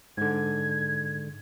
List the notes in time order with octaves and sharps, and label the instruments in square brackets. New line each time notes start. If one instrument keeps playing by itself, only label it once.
[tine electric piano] G#2 D3 [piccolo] G#6